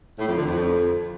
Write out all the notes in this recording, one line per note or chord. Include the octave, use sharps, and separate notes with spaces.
A2
F2
D3
F2